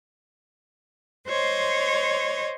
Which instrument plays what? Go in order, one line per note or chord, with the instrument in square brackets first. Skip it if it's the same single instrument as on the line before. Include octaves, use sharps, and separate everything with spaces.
[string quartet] C5 C#5 D#5 C6